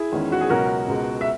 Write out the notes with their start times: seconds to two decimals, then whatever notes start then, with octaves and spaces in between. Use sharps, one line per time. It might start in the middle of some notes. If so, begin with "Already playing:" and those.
Already playing: E4 G#4
0.12 E2 D#3 G#3 C#4
0.32 F#4
0.41 G#4
0.49 C#2 B2 F#3 C#4 F#4 A#4
0.88 C#2 B2 G#3
1.21 E5